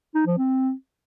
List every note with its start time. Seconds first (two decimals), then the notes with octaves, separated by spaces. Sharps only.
0.15 D#4
0.26 F3
0.38 C4